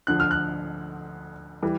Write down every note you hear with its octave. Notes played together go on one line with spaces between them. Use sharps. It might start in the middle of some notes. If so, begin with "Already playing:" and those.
D2 D3 F3 F#6
F6
F#6
E3 G3